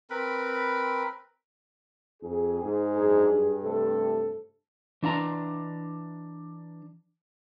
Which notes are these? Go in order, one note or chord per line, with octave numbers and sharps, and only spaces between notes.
C4 A#4 B4 B5
F2 G#4
G#2
F#2 D4 G#4
G2
C3 A3 A4
E3 D4 E5 A#5